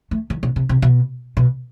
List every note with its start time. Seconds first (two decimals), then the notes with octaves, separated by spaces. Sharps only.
0.11 A3
0.30 D#3
0.43 B2
0.56 C3
0.69 C3
0.82 B2
1.37 B2